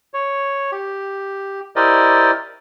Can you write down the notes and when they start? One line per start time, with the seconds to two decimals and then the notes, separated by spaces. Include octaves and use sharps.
0.14 C#5
0.72 G4
1.76 E4 G4 A#4 C5 D5 D#5